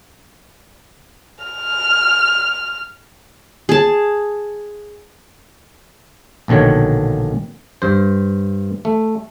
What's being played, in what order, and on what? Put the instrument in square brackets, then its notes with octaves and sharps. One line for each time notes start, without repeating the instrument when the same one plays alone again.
[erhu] F6
[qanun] G#4 A5
[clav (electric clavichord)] A#1 B2 D3 D#3 C#5
G2 C5
A3